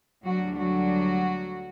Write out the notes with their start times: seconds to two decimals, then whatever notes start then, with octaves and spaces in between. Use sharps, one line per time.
0.24 D2 D3 F#3 G3 D4 F#4
0.56 F#3 F#4